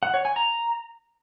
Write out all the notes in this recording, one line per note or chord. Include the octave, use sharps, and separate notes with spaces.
F#5
C#5
G#5
A#5